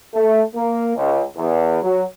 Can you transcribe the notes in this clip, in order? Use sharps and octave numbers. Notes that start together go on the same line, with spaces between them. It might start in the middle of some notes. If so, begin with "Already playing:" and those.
A3
A#3
C#2
E2
F#3